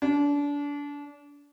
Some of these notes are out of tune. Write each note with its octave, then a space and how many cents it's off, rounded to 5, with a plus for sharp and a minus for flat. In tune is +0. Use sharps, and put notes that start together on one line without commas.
D4 -30